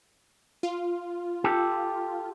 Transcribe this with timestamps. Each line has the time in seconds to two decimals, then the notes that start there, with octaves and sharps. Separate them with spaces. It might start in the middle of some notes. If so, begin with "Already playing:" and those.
0.63 F4
1.44 G4 A4